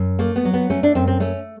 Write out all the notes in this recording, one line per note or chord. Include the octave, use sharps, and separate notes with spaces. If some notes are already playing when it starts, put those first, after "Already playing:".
Already playing: F#2
A3 A#3
B3
F#3
B3
A3 C#4
D4
F#2 C4
C4
A3 C#4